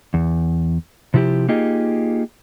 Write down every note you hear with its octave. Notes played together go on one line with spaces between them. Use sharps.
E2
C3 F3 E4 F4 G4
A#3 D#4 F4 G4 G#4 D#5